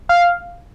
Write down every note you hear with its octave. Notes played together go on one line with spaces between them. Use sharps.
F5